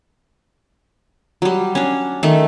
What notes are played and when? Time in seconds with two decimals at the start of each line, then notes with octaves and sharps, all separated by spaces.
1.42 F#3 G3
1.75 C#4 D4
2.23 D#3 A3